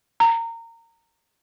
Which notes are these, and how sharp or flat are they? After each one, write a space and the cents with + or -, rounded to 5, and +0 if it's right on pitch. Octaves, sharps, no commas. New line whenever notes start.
A#5 -20